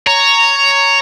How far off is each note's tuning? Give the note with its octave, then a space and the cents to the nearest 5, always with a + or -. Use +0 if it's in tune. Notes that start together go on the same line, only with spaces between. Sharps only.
C#5 +5 A#5 -10